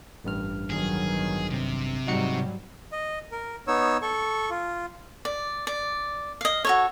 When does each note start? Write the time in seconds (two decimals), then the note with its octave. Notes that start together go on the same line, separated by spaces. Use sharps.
0.24 A1 G2 F6
0.70 D#3 F#3 B3 G#4
1.51 C3
2.07 G#2 F#3 G3 D#4 F#4 C#7
2.92 D#5
3.32 A#4
3.67 B3 D#4 C#5 E6
4.02 A4 C#6
4.50 F4
5.25 D5
5.67 D5
6.41 D#5 F5
6.65 F#4 A4 C#5